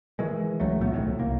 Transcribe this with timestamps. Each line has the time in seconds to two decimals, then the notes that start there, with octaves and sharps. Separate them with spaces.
0.19 D#3 E3 G#3
0.60 C#2 F#3 A3
0.80 A#2 F#3 A3 B3
0.92 B1 F2 A2 D#3
1.19 C2 A#3